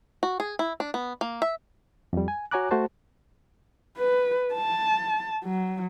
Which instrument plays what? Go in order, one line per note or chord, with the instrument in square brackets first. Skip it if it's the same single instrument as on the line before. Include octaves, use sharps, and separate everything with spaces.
[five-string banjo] F#4
G#4
E4
D4
B3
A#3
E5
[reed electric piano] F2 G3
G#5
F#4 C#5 G#5 A#5 D6 F#6
A3 F#4 C5 A5
[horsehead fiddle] B4
A5
F#3